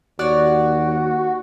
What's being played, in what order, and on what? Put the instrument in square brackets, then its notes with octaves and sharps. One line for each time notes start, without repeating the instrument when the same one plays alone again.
[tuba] D#2 [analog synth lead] F#4 [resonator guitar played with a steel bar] C#5 D5